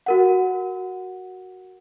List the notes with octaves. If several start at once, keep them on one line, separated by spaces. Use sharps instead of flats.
F#4 A#4 F#5